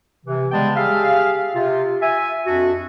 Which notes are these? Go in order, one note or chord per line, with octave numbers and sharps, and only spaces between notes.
C3 E3
C#3 G3 G#3 B3 G5 A5
G4 G#4 E5 F5
C3 F4
E5 G#5
F2 D4 F#4